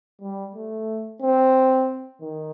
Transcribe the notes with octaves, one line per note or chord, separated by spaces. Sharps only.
G3
A3
C4
D#3